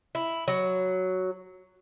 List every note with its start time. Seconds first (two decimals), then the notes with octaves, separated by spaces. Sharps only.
0.15 E4
0.48 F#3